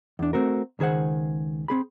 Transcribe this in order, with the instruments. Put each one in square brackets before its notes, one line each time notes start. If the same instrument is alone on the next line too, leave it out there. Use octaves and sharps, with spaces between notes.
[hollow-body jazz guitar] E2 D4
A3 C4 F#4 A#4
C#2 D#3 G#4 C5 F#5
C4 G#4 B5